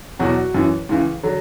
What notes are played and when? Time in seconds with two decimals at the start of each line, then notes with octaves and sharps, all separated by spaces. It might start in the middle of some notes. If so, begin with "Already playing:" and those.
0.19 E2 B2 F#3 F#4
0.54 F#2 E3
0.89 C#2 C#3 E3
1.23 D3 F#3